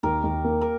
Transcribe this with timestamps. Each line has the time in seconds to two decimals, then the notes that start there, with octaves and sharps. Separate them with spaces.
0.03 D#2 G4 A#4
0.24 D#2
0.44 A#3
0.61 A#4